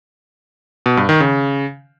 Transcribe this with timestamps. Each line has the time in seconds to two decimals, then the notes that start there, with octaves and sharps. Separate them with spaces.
0.86 B2
0.97 G2
1.09 D#3
1.20 C#3